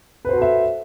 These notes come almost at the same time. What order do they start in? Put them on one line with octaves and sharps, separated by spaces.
B4 C5 F#4 A4 E5